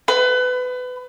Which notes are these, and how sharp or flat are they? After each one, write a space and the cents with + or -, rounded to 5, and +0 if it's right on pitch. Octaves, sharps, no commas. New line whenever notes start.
B4 +25